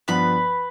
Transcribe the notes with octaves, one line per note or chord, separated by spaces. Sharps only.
G2 F3 B3 B4 B5